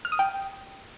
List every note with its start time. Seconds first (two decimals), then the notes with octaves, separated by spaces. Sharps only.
0.05 F6
0.12 D#6
0.19 G5